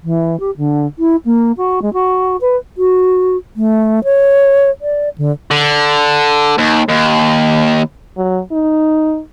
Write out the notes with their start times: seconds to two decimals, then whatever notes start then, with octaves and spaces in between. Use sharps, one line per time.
0.04 E3
0.40 G4
0.57 D3
0.99 E4
1.25 A#3
1.57 F#4
1.82 G#3
1.93 F#4
2.41 B4
2.78 F#4
3.56 A3
4.04 C#5
4.81 D5
5.18 D3
5.51 D3
6.58 D#2
6.89 D#2
8.17 F#3
8.52 D#4